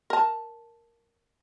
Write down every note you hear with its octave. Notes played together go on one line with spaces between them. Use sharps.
A#4 A5